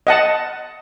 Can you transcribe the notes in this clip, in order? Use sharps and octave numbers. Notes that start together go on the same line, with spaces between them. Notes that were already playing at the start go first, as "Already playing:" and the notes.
D#5 F#5 A5